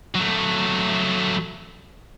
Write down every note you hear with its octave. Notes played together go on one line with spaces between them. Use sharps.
F#3 A3